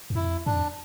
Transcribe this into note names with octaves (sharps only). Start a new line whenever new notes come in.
E2
F2 E4
G2 D4
F2